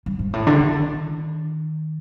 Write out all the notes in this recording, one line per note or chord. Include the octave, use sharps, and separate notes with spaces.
G2
G#2
A2
D3
D#3